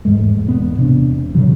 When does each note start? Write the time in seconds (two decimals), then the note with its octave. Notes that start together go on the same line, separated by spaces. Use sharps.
0.05 E2 G#2 G#3 A3
0.46 E1 A1 B3
0.77 E1 C3 D4
1.35 A#2 C#3 E3 F#3